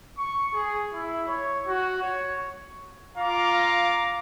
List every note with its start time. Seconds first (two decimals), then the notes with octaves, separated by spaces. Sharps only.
0.17 C#6
0.53 G#4
0.93 E4
1.27 C#5
1.67 F#4
2.02 C#5
3.16 F4 F5 A#5 D6